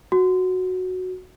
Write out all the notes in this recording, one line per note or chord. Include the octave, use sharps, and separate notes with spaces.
F#4